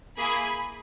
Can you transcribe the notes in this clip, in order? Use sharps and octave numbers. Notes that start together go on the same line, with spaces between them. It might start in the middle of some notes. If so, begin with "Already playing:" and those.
A#3 E4 G#4 G#5 B5